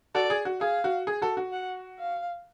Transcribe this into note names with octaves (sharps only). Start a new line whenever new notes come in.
F#4 A4 D5
G#4
F#4
G#4 F5
F#4
G#4
F#4 A4
F#4
F#5
F5